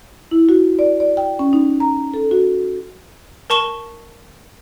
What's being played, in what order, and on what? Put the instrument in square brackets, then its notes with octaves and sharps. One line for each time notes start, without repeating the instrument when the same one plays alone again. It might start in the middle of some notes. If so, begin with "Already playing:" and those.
[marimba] E4
F#4
D5
D5
G5
C#4
D#4
A#5
A4
F#4
[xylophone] A#4 A5 C#6 E7 G7